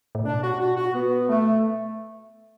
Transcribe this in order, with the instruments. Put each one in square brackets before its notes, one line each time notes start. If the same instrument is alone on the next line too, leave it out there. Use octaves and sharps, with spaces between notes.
[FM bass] A2
[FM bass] B2 [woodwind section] D4
[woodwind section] F#4
F#4
F#4
B3
A3